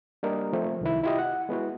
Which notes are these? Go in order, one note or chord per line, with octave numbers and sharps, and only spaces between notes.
G3 A#3 D4 A#4 D#5
F3 A3 C4
C2 D#3 E4
E4 F4 G4 D#5
F#5
G#3 B3 E4 F#4